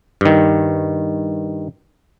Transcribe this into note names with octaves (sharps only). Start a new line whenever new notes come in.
G2 D#3